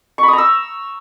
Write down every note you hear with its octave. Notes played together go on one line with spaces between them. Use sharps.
C#6
B5
D#6
A#5
E6